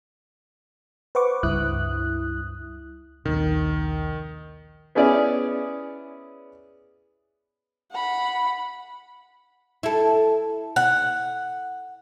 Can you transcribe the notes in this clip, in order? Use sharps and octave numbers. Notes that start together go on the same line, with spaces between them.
B4 C5 F#5 C#6 D6
C#2 G2 E4 D#6 F#6
A#1 D#2 C3 D#3
B3 C#4 E4 G#4 D5
F#5 B5
E4 A4
F#5